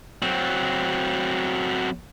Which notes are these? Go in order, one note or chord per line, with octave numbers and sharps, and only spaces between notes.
F#3 C4